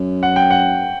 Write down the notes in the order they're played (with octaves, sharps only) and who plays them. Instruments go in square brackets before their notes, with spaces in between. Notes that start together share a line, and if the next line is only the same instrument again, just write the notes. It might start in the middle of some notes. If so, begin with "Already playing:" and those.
Already playing: [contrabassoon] F#2
[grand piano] F#5
G5
F#5